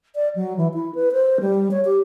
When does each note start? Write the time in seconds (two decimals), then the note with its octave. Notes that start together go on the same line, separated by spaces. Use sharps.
0.15 D5
0.36 F#3
0.57 E3
0.74 E4
0.95 B4
1.12 C5
1.41 G3
1.71 C#5
1.85 G4